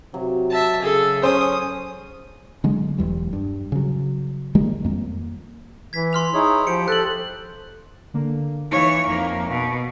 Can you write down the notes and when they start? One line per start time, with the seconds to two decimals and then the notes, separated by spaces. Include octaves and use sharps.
0.14 C3 F#3
0.51 E5 A5
0.81 C#3 G#4 A4
1.23 C#4 C5 D#6
2.64 D3 F#3 G#3
2.98 E1 E2 G3
3.33 G2
3.72 C#3 F#3
4.55 D#3 G3 G#3 A#3
4.84 F2 A#3
5.93 E3 G#6 B6
6.13 C6 F6 F7
6.34 D#4 E4 G#4 C#5
6.67 F3 G4 C5 C#7 D7
6.88 A4 F#6 F#7
8.14 D3 A#3
8.71 E3 D#4 C#5 E5 F5
9.08 F2 A#3
9.49 B2